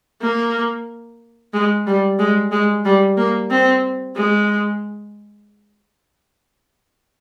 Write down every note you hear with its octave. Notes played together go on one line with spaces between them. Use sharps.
A#3
G#3
G3
G#3
G#3
G3
A#3
C4
G#3